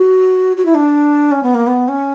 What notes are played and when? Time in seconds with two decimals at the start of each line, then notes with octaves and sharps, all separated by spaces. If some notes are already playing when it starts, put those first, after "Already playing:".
Already playing: F#4
0.57 F#4
0.66 E4
0.75 D4
1.32 C#4
1.43 B3
1.55 A#3
1.67 B3
1.88 C#4